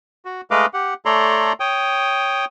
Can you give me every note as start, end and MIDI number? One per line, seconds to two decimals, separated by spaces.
0.25 0.41 66
0.51 0.66 56
0.51 0.66 57
0.51 0.66 71
0.51 0.66 75
0.51 0.66 77
0.51 0.66 86
0.74 0.94 67
0.74 0.94 78
1.05 1.53 57
1.05 1.53 69
1.05 1.53 73
1.05 1.53 74
1.05 1.53 82
1.05 1.53 84
1.60 2.45 73
1.60 2.45 79
1.60 2.45 87